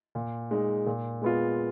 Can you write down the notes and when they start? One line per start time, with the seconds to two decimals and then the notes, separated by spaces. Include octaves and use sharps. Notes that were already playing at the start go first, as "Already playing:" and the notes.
0.15 A#2
0.51 G#3 D#4
0.86 A#2
1.22 G#3 B3 F4